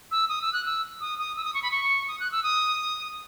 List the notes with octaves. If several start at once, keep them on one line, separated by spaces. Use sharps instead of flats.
E6
D#6
E6
F#6
E6
D#6
D#6
E6
D#6
C#6
B5
C#6
D#6
F#6
E6
D#6